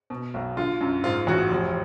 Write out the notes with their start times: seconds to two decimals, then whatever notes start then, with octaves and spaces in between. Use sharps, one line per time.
0.10 B2
0.34 B1
0.57 D3 F4
0.81 F#2
1.04 G#2 F4
1.27 A1 F#4
1.51 F1